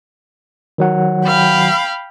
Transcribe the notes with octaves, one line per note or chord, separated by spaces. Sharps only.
D#3 F#3 F#5
F5 G5 B5